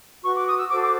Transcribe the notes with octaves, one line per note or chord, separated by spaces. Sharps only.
F#4 B4 C#6
D6
D#6
E6
F#4 A4 C5 D6
D6